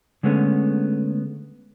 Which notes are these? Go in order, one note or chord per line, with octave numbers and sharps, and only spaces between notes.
D3 G#3 A3 B3 C#4